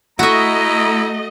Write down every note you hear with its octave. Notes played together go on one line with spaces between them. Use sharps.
A3 E4 F#4 D#5 E5 A#5